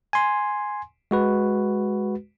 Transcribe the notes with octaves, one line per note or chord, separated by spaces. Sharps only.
G#5 C6
G#3 F#4 B4